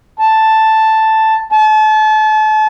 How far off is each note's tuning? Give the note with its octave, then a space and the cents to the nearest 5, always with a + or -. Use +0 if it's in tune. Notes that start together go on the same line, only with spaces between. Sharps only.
A5 +0
A5 -35